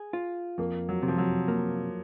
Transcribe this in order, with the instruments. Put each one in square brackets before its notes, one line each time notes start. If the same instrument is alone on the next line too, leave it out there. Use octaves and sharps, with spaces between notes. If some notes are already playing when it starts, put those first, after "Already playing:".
Already playing: [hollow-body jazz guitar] G#4
F4
[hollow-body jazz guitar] F2 [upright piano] A#3
[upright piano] F#3
[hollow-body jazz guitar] C3
[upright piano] F3
F#3
[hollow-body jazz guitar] A#3